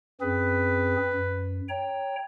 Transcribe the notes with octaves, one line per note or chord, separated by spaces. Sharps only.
F#2 C4 G#4 B4
F#2
C#5 G5 A#5